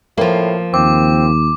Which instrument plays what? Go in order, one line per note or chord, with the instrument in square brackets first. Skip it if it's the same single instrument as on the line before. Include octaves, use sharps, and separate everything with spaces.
[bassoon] A2 [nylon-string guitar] F3 A#3
[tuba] D#2 [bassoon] C4 [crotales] D6